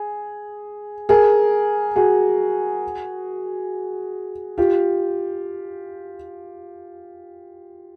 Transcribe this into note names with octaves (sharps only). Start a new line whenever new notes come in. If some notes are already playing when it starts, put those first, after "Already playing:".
Already playing: G#4
G#4 A#4
F#4 G#4
F4 G4